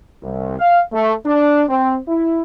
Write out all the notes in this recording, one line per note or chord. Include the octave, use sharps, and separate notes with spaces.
C2
F5
A3
D4
C4
E4